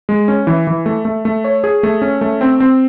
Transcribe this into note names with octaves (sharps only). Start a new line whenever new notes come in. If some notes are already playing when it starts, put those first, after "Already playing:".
G#3
C#4
E3
E3
A3
A3
A3
C#5
G#4
A3
C#4
A3
C4
C4